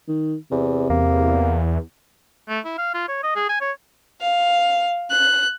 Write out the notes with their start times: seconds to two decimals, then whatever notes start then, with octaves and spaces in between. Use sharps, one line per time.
0.08 D#3
0.51 E2 C3
0.90 E2 A#3
2.49 A3
2.65 E4
2.78 F5
2.94 F4
3.08 C#5
3.23 D#5
3.36 G#4
3.49 G#5
3.61 C#5
4.21 F5
5.10 F#6